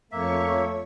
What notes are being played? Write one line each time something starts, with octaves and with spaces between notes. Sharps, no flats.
F2 A3 A#3 C#5 E5 C#6